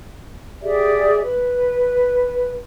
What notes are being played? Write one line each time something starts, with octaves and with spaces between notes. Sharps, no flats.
G4 G#4 D5 E5
B4